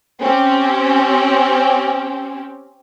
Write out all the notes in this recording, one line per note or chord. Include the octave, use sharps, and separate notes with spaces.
C4 C#4 G4